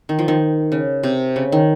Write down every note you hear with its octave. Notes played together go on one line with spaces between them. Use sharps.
D#3
F3
D#3
C#3
C3
C#3
D#3